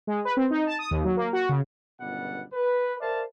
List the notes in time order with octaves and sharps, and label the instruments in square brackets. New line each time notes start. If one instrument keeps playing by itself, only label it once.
[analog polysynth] G#3
B4
C4
D#4
A5
D#6
D#2
F#3
A#3
F#4
C#3
[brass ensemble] G1 C#2 F#2 B2 G3 F#5
B4
A#4 C5 D5 E5 F5 A5